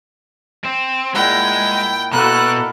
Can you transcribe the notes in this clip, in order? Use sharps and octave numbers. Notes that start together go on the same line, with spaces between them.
C4
A#2 G#3 E4 F#5 G5
B2 A#3 E4 F#4 A4 F#6